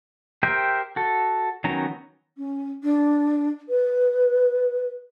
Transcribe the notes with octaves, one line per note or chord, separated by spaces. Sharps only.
G4 A#4 C5 E5 G5
F#4 A4
D#3 F#3 B3 C#4 A#5
C#4
D4
B4